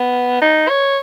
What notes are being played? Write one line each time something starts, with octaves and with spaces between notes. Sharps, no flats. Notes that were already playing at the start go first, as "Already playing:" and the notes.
Already playing: B3
D#4
C#5